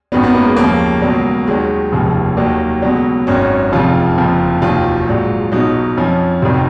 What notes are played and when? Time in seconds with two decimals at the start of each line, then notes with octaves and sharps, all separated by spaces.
0.12 G#1 F#2 D#3 F#3 B3
0.23 B3
0.35 A#3
0.45 G#3
0.57 D#2 C#3 F3 A#3
1.02 C#2 B2 F#3
1.47 D#2 D#3 F#3 G#3
1.92 F1 D#2 C#3 F3
2.37 D#2 D#3 F#3 A#3
2.82 C#2 B2 F#3
3.27 G#1 F#2 D#3 F#3 C#4
3.72 F1 F2 C#3 F3 F4
4.18 F#1 F2 F3
4.62 F1 D#2 D#3 F#3 F4
5.08 A#1 G#2 F#3
5.52 B1 B2 F#3 D#4
5.97 F2 F3 C#4
6.42 F1 F2 D#3 F#3